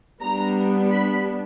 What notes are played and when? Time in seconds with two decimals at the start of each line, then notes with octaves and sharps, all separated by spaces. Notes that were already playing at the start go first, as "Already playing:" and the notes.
0.21 G3 B3 D4 A#5
0.91 B5